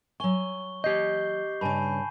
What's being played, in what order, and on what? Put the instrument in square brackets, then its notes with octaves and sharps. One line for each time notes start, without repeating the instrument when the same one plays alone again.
[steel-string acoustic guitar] F#3 G#5 [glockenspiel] C#6 G7
[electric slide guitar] G4 D#5 [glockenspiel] G6 C7
[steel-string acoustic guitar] G2 C#3 [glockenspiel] G#5 A5 B5